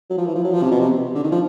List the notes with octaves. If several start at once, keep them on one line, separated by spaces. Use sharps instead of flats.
F#3
F3
E3
F3
F#3
F3
C3
B2
C3
D3
D#3
F3